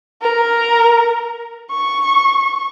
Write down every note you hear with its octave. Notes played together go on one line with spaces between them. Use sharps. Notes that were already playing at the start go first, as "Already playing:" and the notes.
A#4
C#6